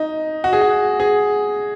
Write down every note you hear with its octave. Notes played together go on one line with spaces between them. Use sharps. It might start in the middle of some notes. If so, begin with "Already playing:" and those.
Already playing: D#4
F#4
G#4
F#4
G#4